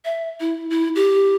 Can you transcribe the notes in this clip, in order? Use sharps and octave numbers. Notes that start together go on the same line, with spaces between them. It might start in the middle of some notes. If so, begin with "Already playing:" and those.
E5
E4
E4
G4